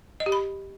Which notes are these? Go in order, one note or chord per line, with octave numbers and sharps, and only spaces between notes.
D#5
G4
B5